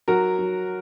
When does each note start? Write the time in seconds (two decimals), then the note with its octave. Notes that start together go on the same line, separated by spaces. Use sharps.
0.08 F#3 F#4 A#4
0.39 F#3